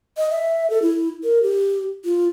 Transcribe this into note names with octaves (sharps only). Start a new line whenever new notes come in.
D#5
E5
A4
E4
A#4
G4
F4